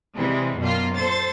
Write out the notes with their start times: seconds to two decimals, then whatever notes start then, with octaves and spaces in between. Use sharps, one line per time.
0.15 C3 E3 G3 G#3
0.58 F#2 B2 A#3 F4
0.95 A#2 A4 C5 A6